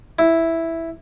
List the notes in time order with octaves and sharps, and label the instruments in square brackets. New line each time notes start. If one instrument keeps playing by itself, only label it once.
[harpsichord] E4